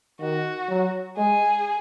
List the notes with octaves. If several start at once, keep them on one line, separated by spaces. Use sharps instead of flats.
D#3 F#4
F#3
G#3 G#4